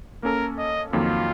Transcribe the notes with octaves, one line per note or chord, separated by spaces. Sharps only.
A#3 C#4 A4 A#4
D#5
F2 D#3 F#3 A#3 F4